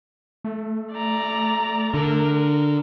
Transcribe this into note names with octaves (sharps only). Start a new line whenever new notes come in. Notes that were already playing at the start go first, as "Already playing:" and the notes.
A3
D5 A#5
D3 A#4